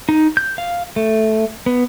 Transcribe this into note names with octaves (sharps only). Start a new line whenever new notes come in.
D#4
G6
F5
A3
B3